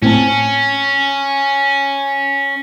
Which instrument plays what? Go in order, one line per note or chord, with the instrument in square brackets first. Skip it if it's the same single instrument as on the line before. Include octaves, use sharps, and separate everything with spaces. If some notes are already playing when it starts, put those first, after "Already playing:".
[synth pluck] A2 C4 A5 [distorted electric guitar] C#4